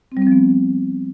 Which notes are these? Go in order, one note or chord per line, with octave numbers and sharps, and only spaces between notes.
C4
G3
C4
F3
B3